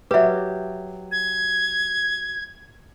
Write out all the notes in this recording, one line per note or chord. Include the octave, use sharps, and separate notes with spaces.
F#3 G4 B4 E5
G#6